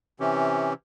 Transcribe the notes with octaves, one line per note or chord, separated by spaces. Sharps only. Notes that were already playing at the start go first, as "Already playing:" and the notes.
C3 E3 C#4 G4